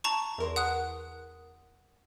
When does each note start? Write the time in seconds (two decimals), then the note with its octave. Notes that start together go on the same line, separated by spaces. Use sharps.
0.04 A5 A#5 C#6
0.38 E2 A#4 C6
0.56 F#5 D#6 F#6